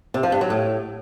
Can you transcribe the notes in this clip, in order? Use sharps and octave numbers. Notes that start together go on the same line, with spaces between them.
C3
F3
G2
F#3
A2